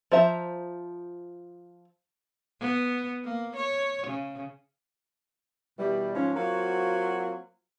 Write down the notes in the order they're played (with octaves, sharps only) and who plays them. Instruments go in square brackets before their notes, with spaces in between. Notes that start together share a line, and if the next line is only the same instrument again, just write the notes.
[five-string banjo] F3 C5 E5 A#5
[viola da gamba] B3
A#3
C#5
C#3
[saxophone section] B2 E3 G3
G#2 F3 C#4
F#3 A#3 C4 F4 F#4